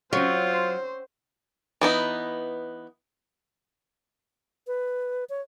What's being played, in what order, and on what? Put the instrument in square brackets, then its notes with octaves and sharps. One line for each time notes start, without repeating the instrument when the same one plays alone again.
[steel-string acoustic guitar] F#3 [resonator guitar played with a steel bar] C4 C#4 C#5 [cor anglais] F4 [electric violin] C5
[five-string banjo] E3 B3 D#4
[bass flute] B4
C#5